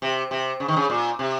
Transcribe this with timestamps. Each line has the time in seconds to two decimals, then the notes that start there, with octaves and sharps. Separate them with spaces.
0.02 C3
0.31 C3
0.60 C#3
0.68 D#3
0.76 C#3
0.90 A#2
1.19 C3